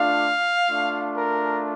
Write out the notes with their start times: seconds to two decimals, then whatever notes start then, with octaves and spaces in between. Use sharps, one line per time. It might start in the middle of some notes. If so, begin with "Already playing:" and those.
Already playing: A3 D4 F4 F5
0.68 A3 D4 F4
1.14 A#4